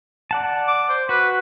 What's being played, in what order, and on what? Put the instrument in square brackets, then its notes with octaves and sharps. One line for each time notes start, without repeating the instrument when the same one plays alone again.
[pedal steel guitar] D5 F#5 A5
[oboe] D6
C5
[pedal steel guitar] F#4 [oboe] B4